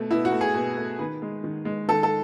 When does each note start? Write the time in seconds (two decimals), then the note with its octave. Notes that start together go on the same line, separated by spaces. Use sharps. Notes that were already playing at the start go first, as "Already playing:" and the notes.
Already playing: B2 A3
0.11 B2 E4
0.25 F#4
0.32 A3
0.41 G#4
0.54 B2
0.77 A3
0.99 D#3 B4
1.22 G#3
1.44 D#3
1.65 G#3
1.88 D#3 A4
2.03 A4